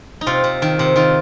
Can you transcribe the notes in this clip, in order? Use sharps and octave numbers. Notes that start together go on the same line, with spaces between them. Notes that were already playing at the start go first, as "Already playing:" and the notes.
D#4
C3 F4
C3
D#3
C3
D#3 F4